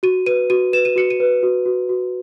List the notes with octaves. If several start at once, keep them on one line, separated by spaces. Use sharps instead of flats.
F#4 D#7
B4 D#7
F#4 D#7
B4 E7
D#7
F#4 C#7
D#7
B4
F#4
F#4
F#4